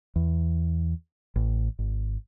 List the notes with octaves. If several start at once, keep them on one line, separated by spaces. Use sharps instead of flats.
E2
A1
G#1